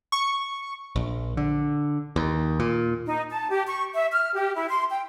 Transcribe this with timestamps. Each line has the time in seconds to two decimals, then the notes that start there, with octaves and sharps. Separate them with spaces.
0.12 C#6
0.96 A#1
1.37 D3
2.16 D#2
2.60 A#2
3.07 D#4
3.30 A5
3.51 G4
3.68 C#6
3.94 E5
4.12 F6
4.33 G4
4.55 E4
4.69 C6
4.91 G5